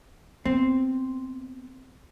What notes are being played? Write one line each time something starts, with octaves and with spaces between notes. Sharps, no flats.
B3 C4